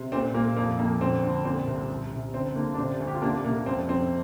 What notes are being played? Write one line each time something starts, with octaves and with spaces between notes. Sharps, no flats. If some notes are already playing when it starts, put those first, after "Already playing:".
Already playing: C3
A#2 C4
A#2 A#3
F2 A#3
F2 A#3
D2 C4
D3
A#2 C4
C2
C2
C3
D3 C4
D3 A#3
D4
C3 C4
D2
G4
F4
C3 A#3 D4
C3 A#3
F2 C4
F2 C4